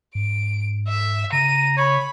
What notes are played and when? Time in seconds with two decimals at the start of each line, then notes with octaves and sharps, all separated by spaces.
0.15 G#2 D7
0.88 E5
1.33 C#3 A#5 D#7
1.78 C#5 B5